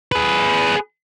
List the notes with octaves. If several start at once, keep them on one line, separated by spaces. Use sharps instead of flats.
G#4 B4